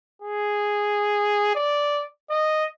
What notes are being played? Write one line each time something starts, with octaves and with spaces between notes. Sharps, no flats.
G#4
D5
D#5